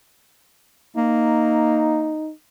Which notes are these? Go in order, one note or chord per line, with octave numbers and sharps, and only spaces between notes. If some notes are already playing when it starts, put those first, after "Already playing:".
A#3 D#4